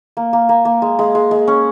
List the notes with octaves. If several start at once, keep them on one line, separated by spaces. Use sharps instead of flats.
A#3
A#3
A#3
A#3
G#3
G#3
G#3
G#3
C#4